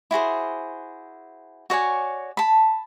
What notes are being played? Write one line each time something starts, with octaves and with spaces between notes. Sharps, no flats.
E4 F#4 G#4 C5
F#4 C#5 D5 G#5
A5 B5